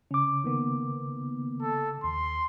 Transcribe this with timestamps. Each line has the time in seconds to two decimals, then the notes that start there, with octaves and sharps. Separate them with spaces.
0.11 C#3 C#4 D6
0.44 D#3 A#3 B3
1.62 A4
2.04 D#2 C6